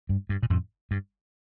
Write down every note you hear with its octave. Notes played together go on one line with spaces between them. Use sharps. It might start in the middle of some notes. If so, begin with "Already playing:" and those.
G2
G2
A#2
F2 A2
G2